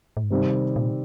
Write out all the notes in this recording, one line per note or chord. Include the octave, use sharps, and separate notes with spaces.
A2
G#2
G2 C3 D#3 G3 C4
A#2